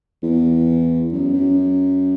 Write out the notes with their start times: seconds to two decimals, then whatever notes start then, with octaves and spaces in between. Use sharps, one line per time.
0.23 E2
1.12 F#2
1.33 F#2